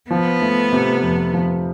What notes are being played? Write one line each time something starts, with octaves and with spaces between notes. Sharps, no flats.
F3 B3
A3
C3
F2
F3